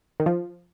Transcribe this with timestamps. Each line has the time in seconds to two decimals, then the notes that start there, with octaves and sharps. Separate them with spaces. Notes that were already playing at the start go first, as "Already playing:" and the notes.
0.20 D#3
0.26 F3